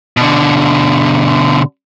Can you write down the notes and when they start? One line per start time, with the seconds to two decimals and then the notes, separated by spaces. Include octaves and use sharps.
0.17 B2 D3